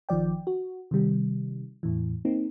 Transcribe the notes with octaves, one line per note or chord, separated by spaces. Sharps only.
G#1 D#3 F3 D5 G5
F#4
C3 D#3 G3
E2 A2 E3
A#3 C4 D#4